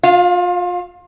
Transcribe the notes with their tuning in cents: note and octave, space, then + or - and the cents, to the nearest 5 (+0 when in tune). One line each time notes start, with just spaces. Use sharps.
F4 +30 F5 -10